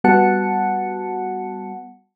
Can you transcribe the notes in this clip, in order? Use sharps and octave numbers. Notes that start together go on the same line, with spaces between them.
G3 B3 F#4 F#5 A5 C#7